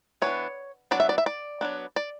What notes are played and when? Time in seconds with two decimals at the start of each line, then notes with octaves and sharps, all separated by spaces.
0.22 E3 B3 D4 C#5
0.91 F#3 B3 D4 D5
1.00 E5
1.09 D5
1.18 E5
1.26 D5
1.61 F#3 B3 D4
1.96 D5